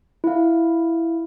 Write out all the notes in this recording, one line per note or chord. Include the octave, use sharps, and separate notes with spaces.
E4 F5